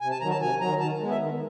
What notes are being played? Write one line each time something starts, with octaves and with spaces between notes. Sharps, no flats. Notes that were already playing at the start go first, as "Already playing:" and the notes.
C3 G#5
A5
D#3 F#3 A#5
A5
C3 G#5
D#3 F#3 A#5
D#3 A5
G#3 B3
E5
D#3